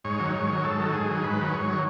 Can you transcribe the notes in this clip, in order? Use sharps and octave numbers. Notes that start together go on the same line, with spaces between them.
G#2 C#5
D#3 F#3
G#2 C#5
D#3 F#3
G#2 A4
D#3 F#3
G#2 G#4
D#3 F#3
G#2 B4
D#3 F#3
G#2 C#5
D#3 F#3